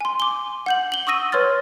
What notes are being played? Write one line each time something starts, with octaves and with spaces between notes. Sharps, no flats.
G#5 C6
D6 G7
F#5 G6 F#7
F#7 G7
C#6 D#6 E6 A#6 D#7
B4 C#5 C6 F6 A6